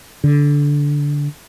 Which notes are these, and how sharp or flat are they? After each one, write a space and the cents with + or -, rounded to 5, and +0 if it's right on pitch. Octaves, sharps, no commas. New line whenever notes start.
D3 -15